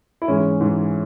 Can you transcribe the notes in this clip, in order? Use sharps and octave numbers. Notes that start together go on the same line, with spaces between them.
E4
G#2 E3 G#3 C#4
G#2 E3 G#3